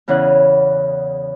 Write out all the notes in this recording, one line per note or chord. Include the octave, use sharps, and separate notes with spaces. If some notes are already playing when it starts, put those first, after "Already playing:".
E2 C#3 E3 C#4 F#5 F#6